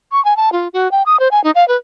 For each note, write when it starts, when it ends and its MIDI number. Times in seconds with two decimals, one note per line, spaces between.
0.12 0.23 85
0.25 0.36 80
0.37 0.52 81
0.52 0.68 65
0.73 0.91 66
0.91 1.03 79
1.06 1.19 87
1.20 1.28 72
1.31 1.42 80
1.44 1.51 63
1.55 1.67 77
1.68 1.77 71